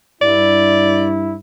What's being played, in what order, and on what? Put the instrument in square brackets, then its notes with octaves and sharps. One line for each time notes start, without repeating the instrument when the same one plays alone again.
[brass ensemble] G2 E4 [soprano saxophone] D5